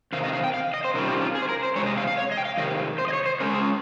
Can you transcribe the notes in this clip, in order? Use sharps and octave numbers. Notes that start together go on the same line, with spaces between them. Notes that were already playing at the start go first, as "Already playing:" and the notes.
C3 D#3 F5
D#5
F5
G5
F5
D#5
C5
C3 D#3 G3 C#4 F4 A#4
G4
F4
G#4
C5
A#4
C5
C3 D#3 G#3 C#5
D#5
F5
F5
C#5
D#5
G5
F5
C3 D#3 D#5
C5
D#5
C#5
C5
C#3 G#3 C#4 A#4
G#4